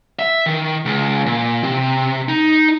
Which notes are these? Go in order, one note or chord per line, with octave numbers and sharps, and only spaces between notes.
E5
D#3
C#2
A#2
C3
D#4